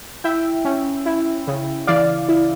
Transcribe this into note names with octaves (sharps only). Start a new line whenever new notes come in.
E4 E5 G5
C#4
E4
C#3
E3 D5 F5
E4